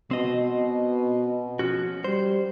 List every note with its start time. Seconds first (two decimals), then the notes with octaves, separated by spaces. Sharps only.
0.11 B2 C4 D#5
1.59 F3 C#4 F#4
2.04 G3 C5